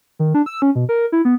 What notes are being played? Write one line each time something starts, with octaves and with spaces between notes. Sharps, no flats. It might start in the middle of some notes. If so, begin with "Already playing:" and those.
D#3
D4
E6
C#4
B2
A#4
E4
B3